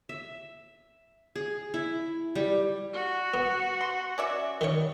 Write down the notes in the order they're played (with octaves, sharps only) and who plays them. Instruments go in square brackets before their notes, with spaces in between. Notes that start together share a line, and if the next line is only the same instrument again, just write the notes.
[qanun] E5
G#4
E4
G3
[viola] F#4
[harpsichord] B3
[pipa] C6
C#4 D5 E5
[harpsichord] D#3 C#5 [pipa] G3 B3